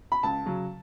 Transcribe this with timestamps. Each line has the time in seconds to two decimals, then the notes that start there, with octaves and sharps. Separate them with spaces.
0.12 B5
0.23 C#2 A5
0.46 C#3 F#3